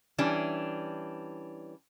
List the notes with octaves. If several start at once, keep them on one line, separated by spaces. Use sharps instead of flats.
E3 G3 C#4 D4